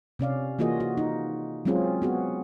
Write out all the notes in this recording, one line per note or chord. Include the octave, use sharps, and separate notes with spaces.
C3 C#4 D5 F5
E3 A#3 F4 F#4 G#4 D#5
F#4
D#4
F#3 G#3 C4 C#4 F4 G#4
B3 F#4 G#4